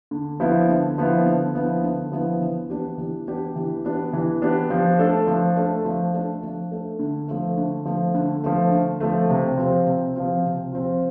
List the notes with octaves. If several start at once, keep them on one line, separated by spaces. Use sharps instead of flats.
D3
F3 B3 E4
D3
F3 B3 E4
D3
F3 B3 E4
D3
F3 B3 E4
E3
B3 D4 G4
E3
B3 D4 G4
E3
B3 D4 G4
E3
B3 D4 G4
F3
A3 D4 A4
F3
A3 D4 A4
F3
A3 D4 A4
F3
A3 D4 A4
D3
F3 A3
D3
F3 A3
D3
F3 A3
D3
F3 A3
C3
F3 C4 F4
C3
F3 C4 F4
C3
F3 C4 F4